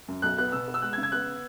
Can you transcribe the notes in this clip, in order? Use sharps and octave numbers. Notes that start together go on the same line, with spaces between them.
F#2
B1 F#6
B3 F#6
B2 E6
B3
E6
G#3 F#6
G#6
C#3
G#6
B3 F#6